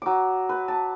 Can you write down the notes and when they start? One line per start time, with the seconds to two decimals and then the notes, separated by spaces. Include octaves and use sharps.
0.02 F#3 D6
0.49 B4
0.68 A5